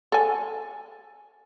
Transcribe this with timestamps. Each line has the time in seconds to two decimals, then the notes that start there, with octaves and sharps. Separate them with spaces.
0.12 A4 G#5